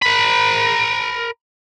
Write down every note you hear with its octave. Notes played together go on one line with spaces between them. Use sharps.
A#4 B5